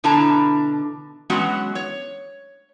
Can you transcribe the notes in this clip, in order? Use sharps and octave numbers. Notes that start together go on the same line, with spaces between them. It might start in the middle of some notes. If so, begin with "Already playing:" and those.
B2 D3 D4 E4 A5 A#5
F#3 G#3 B3 C#4 F#4
C#5